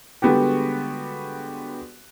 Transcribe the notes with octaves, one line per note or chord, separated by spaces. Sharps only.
D3 G3 G#3 B3 F#4 G4